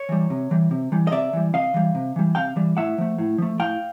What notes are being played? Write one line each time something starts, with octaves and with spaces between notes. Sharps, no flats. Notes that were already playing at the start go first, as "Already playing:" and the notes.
Already playing: C#5
E3 G3
C3
E3 G3
C3
E3 G3
D#5
C3 D5 E5
E3 G3
C3 D#5 F5
E3 G3
C3
E3 G3
C3 F5 G5
E3 G3
A2 E5 F#5
F3 A3
A2
F3 A3
A2 F5 G5